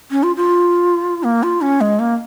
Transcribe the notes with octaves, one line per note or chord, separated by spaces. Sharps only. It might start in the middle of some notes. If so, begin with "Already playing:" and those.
C#4
F4
F4
A#3
F4
C#4
G#3
A#3